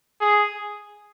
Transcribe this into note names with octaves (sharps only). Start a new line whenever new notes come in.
G#4